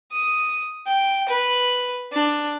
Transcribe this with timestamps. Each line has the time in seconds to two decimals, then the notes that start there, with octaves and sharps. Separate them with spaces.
0.12 D#6
0.87 G5
1.29 B4
2.13 D4